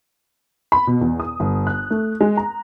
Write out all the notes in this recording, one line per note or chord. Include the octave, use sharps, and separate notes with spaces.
B5
B2
E2
D#6
G1
F#6
A3
G#3
A#5